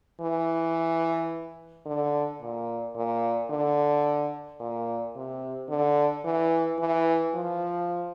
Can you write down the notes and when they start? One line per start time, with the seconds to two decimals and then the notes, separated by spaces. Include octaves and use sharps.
0.21 E3
1.86 D3
2.41 A#2
2.96 A#2
3.50 D3
4.60 A#2
5.16 C3
5.70 D3
6.25 E3
6.79 E3
7.34 F3